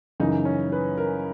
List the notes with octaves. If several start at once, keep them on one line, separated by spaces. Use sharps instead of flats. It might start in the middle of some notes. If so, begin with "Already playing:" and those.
F#2 C#3 E3 D#4
C#4
B4
A#4